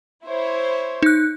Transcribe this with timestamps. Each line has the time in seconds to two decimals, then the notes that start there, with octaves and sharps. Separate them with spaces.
0.25 E4 C5 C#5
1.03 D#4 F#6